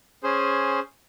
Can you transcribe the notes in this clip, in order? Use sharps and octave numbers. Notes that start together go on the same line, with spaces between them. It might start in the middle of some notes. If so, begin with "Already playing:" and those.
C#4 G#4 C5